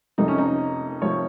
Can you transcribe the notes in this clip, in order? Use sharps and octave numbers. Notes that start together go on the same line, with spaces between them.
F2 C3 F3 D#4
C#4
D#4
C3 F3 C#5